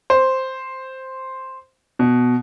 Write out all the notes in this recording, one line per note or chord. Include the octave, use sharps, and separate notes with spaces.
C5
B2